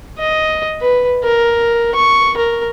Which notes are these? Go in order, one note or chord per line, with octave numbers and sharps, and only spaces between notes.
D#5
B4
A#4
C#6
A#4